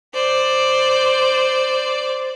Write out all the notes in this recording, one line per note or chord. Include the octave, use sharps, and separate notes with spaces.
C5 D5